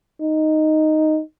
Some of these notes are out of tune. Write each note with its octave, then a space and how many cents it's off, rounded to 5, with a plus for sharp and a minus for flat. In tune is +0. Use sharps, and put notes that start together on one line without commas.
D#4 +0